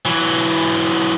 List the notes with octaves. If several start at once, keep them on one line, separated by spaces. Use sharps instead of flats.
E3 F#3